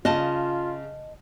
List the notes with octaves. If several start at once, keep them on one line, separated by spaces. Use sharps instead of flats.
C#3 F4 D#5 A5